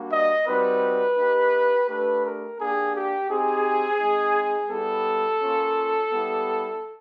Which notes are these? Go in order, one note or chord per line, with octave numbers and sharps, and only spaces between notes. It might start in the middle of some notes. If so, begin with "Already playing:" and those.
Already playing: G3 A#3 D4 F#4
D#5
G3 C4 D#4 F#4 B4
A#3 D#4 G4
A3 D4 G4 B4
A#4
A#3 D4 G4 G#4
G4
C4 D#4 G4 G#4
G#3 C4 D#4
G3 B3 E4 G4 A4
A#3 C#4 F4
G3 B3 E4 G4